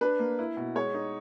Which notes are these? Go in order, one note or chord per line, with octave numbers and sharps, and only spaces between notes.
D4 B4
A#3
E4
B2
G#3 C#5
D#4